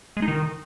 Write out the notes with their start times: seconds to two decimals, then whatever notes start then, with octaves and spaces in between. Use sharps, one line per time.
0.17 G#3
0.22 D#4
0.28 D#3